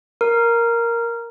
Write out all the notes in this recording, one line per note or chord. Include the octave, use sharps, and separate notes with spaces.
A#4